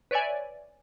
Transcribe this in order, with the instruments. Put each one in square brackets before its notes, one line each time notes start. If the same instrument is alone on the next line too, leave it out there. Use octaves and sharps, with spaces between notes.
[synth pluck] B4 C#5 D5 E5 G#5